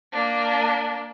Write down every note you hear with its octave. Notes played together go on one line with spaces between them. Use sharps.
A#3 D4